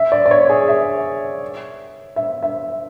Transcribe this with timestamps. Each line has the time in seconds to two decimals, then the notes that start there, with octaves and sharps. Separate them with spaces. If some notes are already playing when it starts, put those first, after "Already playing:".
Already playing: E5
0.12 D5
0.26 D5
0.31 C#5
0.49 G#4
0.68 E5
2.16 E5
2.43 E5